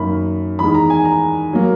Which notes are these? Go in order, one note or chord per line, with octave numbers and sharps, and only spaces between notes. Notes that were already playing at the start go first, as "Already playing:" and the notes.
Already playing: F#2 D#3 A#3 B5
E2 D#3 G#3 B5
A#5
G#5
A#5
F#3 A#3